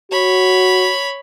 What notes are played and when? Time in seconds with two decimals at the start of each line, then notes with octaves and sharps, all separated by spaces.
0.12 F#4 C#5 B5